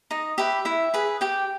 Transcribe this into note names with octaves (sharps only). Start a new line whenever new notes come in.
D#4 D#5
G4 B4 E5
E4 E5
G#4 B4
G4 G5